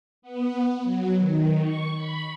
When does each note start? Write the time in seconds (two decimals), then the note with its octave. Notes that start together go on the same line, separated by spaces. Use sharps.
0.22 B3
0.82 F#3
1.19 D#3
1.62 C#6
1.96 B5